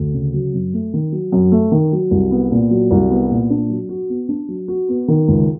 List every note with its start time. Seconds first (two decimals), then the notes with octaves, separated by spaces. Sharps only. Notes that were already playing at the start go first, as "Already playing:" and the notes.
Already playing: D2
0.14 C#3
0.34 F#3
0.54 F#2
0.74 A3
0.94 D#3
1.12 F#3
1.32 F#2
1.52 A3
1.72 D#3
1.92 F#3
2.11 C2
2.31 B3
2.51 A#2
2.71 F#3
2.91 C2
3.11 B3
3.31 A#2
3.50 D4
3.70 F#3
3.89 F#4
4.09 B3
4.29 D4
4.48 F#3
4.68 F#4
4.89 B3
5.08 D#3
5.28 C#2